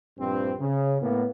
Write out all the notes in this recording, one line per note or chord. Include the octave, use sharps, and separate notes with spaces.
A#1 G2 C4
C#3
A2 A#3 B3